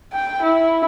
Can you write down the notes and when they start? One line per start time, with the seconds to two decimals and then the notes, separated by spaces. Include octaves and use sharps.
0.13 G5
0.42 E4